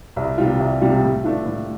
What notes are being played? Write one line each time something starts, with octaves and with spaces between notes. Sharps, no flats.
C2
C3 G3 F4
C2
C3 G3 F4
A2
A3 D4 F4
A2